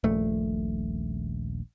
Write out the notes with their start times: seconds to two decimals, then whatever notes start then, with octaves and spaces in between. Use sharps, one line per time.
0.04 D#1 A#1 A3